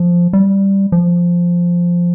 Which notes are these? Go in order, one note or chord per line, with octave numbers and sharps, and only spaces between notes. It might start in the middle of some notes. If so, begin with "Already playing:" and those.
Already playing: F3
G3
F3